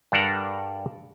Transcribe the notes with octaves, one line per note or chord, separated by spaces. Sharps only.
G2 G3 D4 A4 A#4 F#5